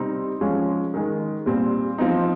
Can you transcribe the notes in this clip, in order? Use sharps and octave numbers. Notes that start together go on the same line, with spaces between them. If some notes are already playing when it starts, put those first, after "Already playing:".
Already playing: C3 G3 C4 D#4
F3 G#3 C#4
D#3 G#3 D#4
A#2 G3 C4
F3 C4 D#4